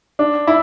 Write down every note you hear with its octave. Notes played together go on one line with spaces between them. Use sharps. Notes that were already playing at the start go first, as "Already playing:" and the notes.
D4
E4